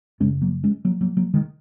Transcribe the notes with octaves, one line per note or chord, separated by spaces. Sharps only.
F#2 C#3 G#3 C#4
F#3 A#3
G#3 C#4
F#3 A#3
F#3 A#3
F#3 A#3
D#3 G#3